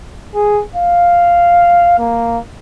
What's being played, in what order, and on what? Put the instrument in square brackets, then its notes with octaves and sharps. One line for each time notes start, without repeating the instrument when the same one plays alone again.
[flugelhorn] G#4
F5
A#3